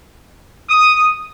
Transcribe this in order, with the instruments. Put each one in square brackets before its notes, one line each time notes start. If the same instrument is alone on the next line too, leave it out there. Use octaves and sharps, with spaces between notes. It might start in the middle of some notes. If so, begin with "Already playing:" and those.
[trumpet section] D#6